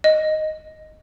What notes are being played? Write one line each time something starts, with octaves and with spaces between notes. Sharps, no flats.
D#5